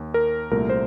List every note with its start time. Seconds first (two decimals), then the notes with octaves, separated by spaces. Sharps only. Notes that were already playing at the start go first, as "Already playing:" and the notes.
Already playing: D#2
0.14 A#4
0.51 C2 A#2 A3 A#4
0.70 C5